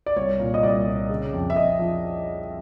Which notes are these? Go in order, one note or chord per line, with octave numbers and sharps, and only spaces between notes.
D5
C2 C#5
A#2
D#5
C2 D5
A#2
C#3
F2
E5
F2 D#5
F3